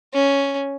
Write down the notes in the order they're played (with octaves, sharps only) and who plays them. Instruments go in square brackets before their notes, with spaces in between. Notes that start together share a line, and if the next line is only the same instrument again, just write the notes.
[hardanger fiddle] C#4